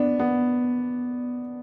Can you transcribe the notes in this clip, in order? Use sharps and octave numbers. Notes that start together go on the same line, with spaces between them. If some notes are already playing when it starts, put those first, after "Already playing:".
Already playing: B3 D4
B3